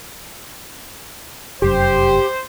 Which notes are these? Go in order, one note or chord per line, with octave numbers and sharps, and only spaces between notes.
F1 F#2 G4 C5